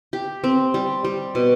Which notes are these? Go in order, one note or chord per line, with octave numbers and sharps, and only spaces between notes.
G4
C4
G3
G3
B2